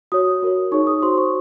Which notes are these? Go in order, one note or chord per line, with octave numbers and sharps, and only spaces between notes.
F#4 C#5 D#6
F#4 A#4 C#5
D#4 G#4 C#5 C#6
D#6
F#4 C5 C6
C#6